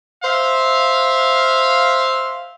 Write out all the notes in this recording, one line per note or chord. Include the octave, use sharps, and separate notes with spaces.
C5 E5 F5